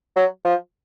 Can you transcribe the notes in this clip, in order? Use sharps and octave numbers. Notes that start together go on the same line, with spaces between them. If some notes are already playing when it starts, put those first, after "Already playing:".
F#3
F3